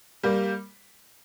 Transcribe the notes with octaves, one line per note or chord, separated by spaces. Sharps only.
G3 A#3